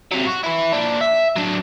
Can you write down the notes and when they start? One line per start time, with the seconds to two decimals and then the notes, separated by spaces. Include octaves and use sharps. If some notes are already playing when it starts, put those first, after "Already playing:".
0.12 C3 F#3
0.27 F#4
0.44 E4 B4
0.73 A#2 D4
1.01 E5
1.36 F#3 D4